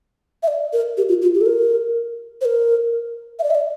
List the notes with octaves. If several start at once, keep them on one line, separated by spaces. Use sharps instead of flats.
E5
D5
A#4
G4
F4
F4
G4
A4
A#4
C5
A#4
E5
D5
E5
D5